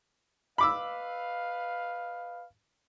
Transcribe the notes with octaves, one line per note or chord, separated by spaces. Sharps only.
B4 D#5 F5 B5 D6 E6